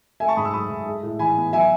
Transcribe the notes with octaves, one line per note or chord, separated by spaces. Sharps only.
A3 E5 G#5
A5 C#6
G#2 B5 D#6
C#6 E6
F#3 B5 D#6
G#2
G#3
A2
E3 G#5 B5
B3
F#3 E5 G#5